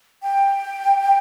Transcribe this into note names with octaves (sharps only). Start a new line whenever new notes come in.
G5